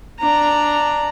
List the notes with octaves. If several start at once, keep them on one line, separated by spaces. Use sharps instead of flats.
D4 A#5